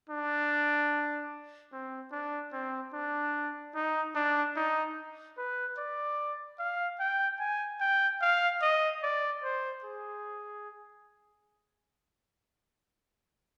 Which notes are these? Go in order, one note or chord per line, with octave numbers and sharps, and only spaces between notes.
D4
C4
D4
C4
D4
D#4
D4
D#4
B4
D5
F5
G5
G#5
G5
F5
D#5
D5
C5
G#4